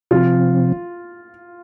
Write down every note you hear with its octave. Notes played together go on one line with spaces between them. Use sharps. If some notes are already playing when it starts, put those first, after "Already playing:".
C3 F3 C4 F4